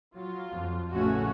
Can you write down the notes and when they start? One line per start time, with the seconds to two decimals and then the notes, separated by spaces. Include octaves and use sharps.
0.14 F#3 F4
0.52 F2
0.91 A1 C#3 A3 C#4 F#4